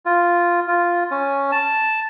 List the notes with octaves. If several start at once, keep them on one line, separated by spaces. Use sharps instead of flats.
F4
F4
C#4
A5